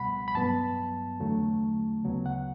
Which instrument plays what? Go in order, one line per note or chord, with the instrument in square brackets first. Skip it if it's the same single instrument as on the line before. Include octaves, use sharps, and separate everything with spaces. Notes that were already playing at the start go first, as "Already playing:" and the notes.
Already playing: [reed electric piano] C#2 B2 G3 F#5 B5
B5
G2 F#3 B3 A5
E2 D3 F#3 A3
D2 C#3 F#3 B3
F#5